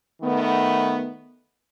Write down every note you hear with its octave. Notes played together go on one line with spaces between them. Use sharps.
D#3 A3 B3